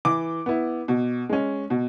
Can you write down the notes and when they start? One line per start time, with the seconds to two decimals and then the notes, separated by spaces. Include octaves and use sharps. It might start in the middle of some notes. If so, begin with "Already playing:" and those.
0.05 E3 D6
0.46 B3 E4
0.88 B2
1.29 G#3 C#4
1.70 B2